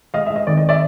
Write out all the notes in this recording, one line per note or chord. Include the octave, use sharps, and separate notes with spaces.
G#3 D#5 F5
G#3 E5
D#5
G#1 D5
D#5
D5 E5